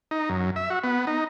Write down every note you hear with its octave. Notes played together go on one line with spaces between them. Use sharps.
D#4
F#2
E5
F#4
B3
D#4